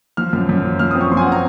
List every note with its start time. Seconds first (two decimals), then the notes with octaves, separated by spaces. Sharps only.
0.17 F3 F6
0.33 F#2
0.49 F#2
0.64 F3
0.79 F3 F6
0.91 C4 D#6
1.01 C#6
1.12 F3 C6
1.17 G#5
1.21 F#5
1.27 C4 A#5